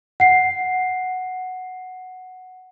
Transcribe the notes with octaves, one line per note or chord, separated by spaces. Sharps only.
F#5 C7